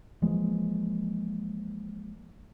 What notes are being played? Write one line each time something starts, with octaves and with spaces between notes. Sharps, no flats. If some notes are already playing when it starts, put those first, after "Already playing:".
E3 F3 G#3 A#3